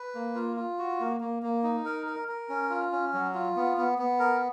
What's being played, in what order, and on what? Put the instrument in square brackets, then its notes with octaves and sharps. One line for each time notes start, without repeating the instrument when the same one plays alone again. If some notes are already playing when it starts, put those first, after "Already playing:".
Already playing: [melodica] B4
A#3
F4
F4
F#4
A#3
A#3
A#3
D#4
A#4
A#4
A#4
C#4
F4
C#4
F#3
F4
B3
B3
B3
A#4